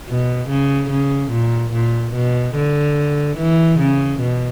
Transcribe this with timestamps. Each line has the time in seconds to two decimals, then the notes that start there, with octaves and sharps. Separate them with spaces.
0.08 B2
0.49 C#3
0.90 C#3
1.31 A#2
1.73 A#2
2.14 B2
2.55 D3
3.37 E3
3.79 C#3
4.21 B2